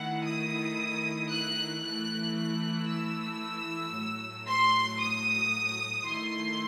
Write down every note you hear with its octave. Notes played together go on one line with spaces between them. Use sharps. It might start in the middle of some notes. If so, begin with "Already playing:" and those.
Already playing: D#3 A3 E4 F#5
D#6
F#6
E3 A3 E4 F#6
F#6
E6
A2 F#3 A3
C6
D#6
D#3 A3 E4 C6